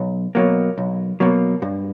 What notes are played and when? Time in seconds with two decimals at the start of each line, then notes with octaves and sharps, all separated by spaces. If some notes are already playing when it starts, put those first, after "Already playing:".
Already playing: B1
0.35 B2 F#3 A#3
0.78 B1
1.20 B2 F#3 A#3
1.62 G2